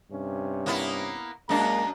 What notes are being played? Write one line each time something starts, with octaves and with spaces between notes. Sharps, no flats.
G2 C3 C#4
A#3 B3 E4
F#2 G#3 A#3 D4 A#5